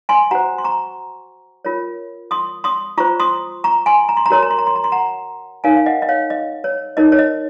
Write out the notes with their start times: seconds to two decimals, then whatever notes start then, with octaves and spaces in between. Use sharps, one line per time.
0.09 G#5 C6
0.31 F#4 C5 F#5 A#5
0.58 C6
0.64 A#5 C#6
1.65 F4 A#4 C#5
2.31 C6 D#6
2.64 C6 D#6
2.98 F4 C5 A#5 C#6
3.20 C6 D#6
3.64 A#5 C#6
3.86 G#5 C6
4.09 A#5
4.17 C6
4.26 A#5
4.30 F#4 A#4 C#5 C6
4.43 A#5
4.51 C6
4.58 A#5
4.67 C6
4.75 A#5
4.84 C6
4.92 F#5 A#5
5.64 D#4 A#4 C#5 F5 G#5
5.76 F5
5.86 D#5 F#5
6.02 D#5
6.08 C#5 F5
6.30 D#5
6.64 C#5
6.97 D#4 A#4 C#5 D#5
7.12 C#5
7.19 D#5